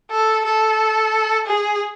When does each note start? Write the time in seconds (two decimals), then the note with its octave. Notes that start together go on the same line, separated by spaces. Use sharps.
0.11 A4
0.45 A4
1.47 G#4